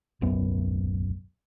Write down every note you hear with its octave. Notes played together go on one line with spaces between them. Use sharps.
D1 B1 F#2 B3